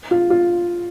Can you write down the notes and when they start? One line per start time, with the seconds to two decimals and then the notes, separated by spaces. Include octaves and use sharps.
0.11 F4
0.30 F4